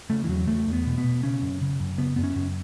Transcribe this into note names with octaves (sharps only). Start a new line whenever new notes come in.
C#3 A3
E3
E2 F#3
E2 A3
E2
B3
B2
B3
B2
C#3 C#4
F#2
C#3
F#2
C#3 B3
F#2 B3
C#4
F#2